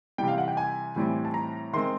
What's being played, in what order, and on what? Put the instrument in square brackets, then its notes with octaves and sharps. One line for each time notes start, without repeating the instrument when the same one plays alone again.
[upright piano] C3 E3 G3 G5
F5
F#5
G5
G#5
A2 E3 G3 C4
A5
A#5
D#3 G#3 C4 C6